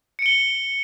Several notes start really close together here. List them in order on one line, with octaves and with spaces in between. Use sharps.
C#7 D7 G7